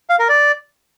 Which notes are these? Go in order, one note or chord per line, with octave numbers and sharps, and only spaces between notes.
F5
A#4
D5